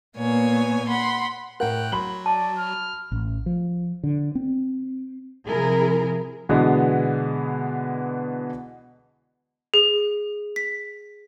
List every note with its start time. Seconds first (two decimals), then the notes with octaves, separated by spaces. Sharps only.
0.18 A#2 A#3 B3 C#5 G#5
0.88 F#5 B5 C6
1.60 A2 A#4 F#5 G5 F#6
1.92 F#3 B5 C6 F#7
2.26 D5 A5
2.57 F6
3.12 A1
3.46 F3
4.03 D3
4.35 C4
5.47 C3 F3 E4 G#4 A#4
6.49 B2 D3 E3 G#3 B3
9.74 G#4
10.56 B6